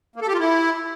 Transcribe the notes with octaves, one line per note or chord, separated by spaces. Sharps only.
A#3
A4
G4
F4
E4